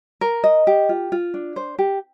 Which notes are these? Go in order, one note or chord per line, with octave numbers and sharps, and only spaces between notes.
A#4
D#5
G4
F4
F4
D4
C5
G4